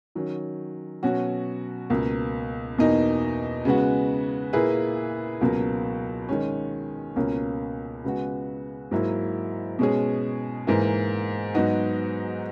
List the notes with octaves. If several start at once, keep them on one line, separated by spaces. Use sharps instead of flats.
D#3 F#3 C#4
B2 F#3 C#4 F#4
C#2 B2 A#3
E2 B2 A#3 D#4
C#3 G#3 B3 F#4
A#2 A#3 E4 G#4 B4
C#2 B2 F#3 A#3
D#3 G#3 C#4
C#2 B2 A#3 C#4
C#3 G#3 B3 F#4
G#2 F#3 A#3 E4
B2 G#3 C#4 G#4
G#2 E3 A#3
G#2 F#3 B3 D#4 F#4